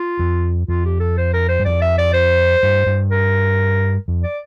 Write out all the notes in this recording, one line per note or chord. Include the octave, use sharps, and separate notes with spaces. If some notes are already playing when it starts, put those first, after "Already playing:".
Already playing: F4
F2
F2 F4
G4
A4
C5
A#4
C5
G2
F2 D5
E5
D5
C5
G2
G2
A#4
F2
D5